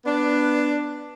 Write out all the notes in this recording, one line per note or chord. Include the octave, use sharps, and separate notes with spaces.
B3 D4